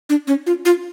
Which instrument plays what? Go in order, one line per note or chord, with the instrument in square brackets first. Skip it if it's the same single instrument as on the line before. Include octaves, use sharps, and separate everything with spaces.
[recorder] D4
C#4
F4
F4